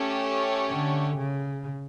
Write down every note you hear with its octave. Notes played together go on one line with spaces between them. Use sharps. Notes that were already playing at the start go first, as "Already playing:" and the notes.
Already playing: A3 C#4 G4 C#5
D3
C#3